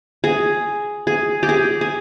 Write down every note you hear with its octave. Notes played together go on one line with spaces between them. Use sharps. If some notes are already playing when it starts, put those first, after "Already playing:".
G#4
G#4
G4
G#4
G#4